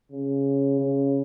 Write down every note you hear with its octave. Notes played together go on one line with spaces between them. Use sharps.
C#3
C#3